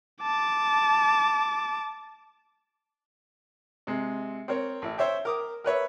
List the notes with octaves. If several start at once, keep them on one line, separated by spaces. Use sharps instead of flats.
A5 D6
C3 G#3
C4 A#4 C#5
A1 E4
C5 C#5 E5 G5
A#4 D6 D#6
A#4 B4 C#5 E5